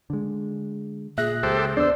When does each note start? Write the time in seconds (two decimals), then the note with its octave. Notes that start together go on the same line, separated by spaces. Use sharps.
0.10 D3 G#3
1.18 A#2 G#4 E5 F#6 A#6
1.43 C#2 G4 A4 C5
1.77 E2 B3 D4 C5 D5 E6